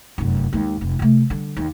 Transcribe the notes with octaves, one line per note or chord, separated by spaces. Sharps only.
F1 F#2
D#2 G#3
F1
C3 A3
D3 G3
D#2